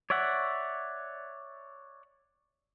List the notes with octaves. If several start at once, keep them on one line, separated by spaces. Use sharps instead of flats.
C#5 D5 E5 F#5